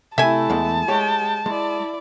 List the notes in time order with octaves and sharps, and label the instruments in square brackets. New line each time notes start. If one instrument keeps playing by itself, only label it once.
[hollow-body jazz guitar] C3 [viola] A3 E4 [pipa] E5 G#5 [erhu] A5
[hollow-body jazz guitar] E2 E3 G#3
[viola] G#3 G5 [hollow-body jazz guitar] G4 C#5
[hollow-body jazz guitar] G#3 [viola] E4 D5